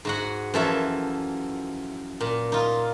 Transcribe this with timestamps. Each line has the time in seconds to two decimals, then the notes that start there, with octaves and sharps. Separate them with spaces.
0.05 G#2 F#4 F#5
0.54 F#2 E3 F3 A4 C#5 E5
2.21 A#2
2.52 D#4 F4